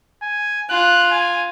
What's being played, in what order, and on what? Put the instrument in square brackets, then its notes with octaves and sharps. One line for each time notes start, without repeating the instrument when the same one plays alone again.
[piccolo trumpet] G#5
[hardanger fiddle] F4 [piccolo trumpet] F#6
[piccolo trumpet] G#5